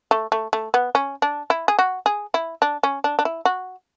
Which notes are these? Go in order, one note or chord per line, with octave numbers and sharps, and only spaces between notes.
A3
A3
A3
B3
C#4
D4
E4
G#4
F#4
G#4
E4
D4
C#4
D4
D4
E4
F#4